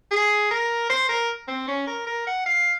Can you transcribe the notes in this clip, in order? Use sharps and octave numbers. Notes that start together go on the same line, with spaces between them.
G#4
A#4
C5
A#4
C4
C#4
A#4
A#4
F#5
F5